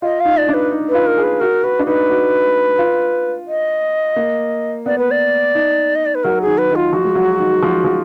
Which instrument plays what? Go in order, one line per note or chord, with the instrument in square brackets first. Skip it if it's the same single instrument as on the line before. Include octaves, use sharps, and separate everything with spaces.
[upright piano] F4 [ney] D#5
[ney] F5
[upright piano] D#4
[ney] D5
[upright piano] D#4
D4
[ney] B4
[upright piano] D#4
[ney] B4
[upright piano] F4
[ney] A#4
[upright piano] G#4
[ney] B4
[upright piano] F#4 [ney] A#4
[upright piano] F#4 [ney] B4
[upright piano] D4
[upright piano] D#4 [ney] B4
[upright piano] F#4
F4
[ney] D#5
[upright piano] A#3
[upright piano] B3 [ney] D5
[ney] B4
D5
[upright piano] D#4
[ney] D#5
D5
B4
[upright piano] F#3 [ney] A#4
[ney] G#4
[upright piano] D#3
[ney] B4
[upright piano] D#3
[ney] F4
[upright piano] F3 [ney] F#4
[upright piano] G#3
F#3
D#3
F3
F3